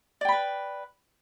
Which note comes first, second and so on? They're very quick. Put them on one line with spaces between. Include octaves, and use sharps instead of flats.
D5 G5 B5 B4